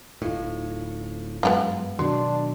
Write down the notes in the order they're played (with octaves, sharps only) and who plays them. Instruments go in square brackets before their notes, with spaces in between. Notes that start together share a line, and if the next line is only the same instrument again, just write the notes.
[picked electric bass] D1 A2 [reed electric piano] D#4 F4
[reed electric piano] G2 F#3 G#3 [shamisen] B3 E4 F4
[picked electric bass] B2 D#3 F#3 [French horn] D4 [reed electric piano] C6